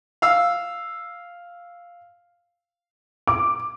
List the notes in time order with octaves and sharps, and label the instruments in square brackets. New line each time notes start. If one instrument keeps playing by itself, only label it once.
[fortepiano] F5 E6
[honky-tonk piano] D6